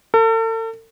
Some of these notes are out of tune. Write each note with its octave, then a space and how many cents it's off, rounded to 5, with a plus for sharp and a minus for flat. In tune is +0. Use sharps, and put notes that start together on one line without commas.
A4 +40